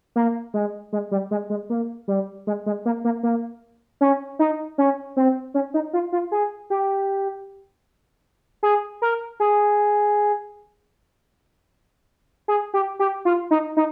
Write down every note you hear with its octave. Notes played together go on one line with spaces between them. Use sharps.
A#3
G#3
G#3
G3
G#3
G#3
A#3
G3
G#3
G#3
A#3
A#3
A#3
C#4
D#4
C#4
C4
C#4
D#4
F4
F4
G#4
G4
G#4
A#4
G#4
G#4
G4
G4
F4
D#4
D#4